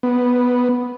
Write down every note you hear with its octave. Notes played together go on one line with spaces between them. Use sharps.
B3